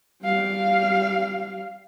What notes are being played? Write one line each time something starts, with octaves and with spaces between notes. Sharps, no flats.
G3 F5